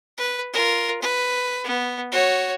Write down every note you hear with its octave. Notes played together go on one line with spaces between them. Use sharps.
B4
F4 A#4
B4
B3
F#4 C#5